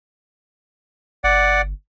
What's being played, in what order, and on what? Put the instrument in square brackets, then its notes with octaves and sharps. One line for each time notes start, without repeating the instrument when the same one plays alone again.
[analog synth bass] G1 [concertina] D5 F#5